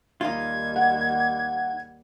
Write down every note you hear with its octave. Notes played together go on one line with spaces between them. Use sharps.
D#2 G3 D#4 F4 G#6
F#5